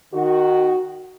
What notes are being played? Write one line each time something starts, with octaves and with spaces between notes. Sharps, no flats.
D#3 F#4